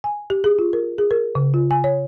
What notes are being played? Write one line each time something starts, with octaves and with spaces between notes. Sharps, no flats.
G#5
G4
G#4
F4
A#4
G#4
A#4
C#3
F4
G#5
C#5